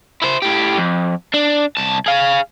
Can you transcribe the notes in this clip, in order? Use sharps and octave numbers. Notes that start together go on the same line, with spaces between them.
E4 C5
A2 G4
F2
D4
C2 A5
G#4 F5